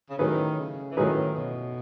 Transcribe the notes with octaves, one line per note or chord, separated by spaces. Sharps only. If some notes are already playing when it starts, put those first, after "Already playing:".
C#3
A2 D#3 F#3 C#4 G#4 B4
C#3
E3
A2 D#3 F#3 C#4 G#4 B4
B2